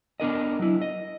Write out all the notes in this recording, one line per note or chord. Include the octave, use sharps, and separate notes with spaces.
B3 D4 A#4 D#5
F#3 E4
D#5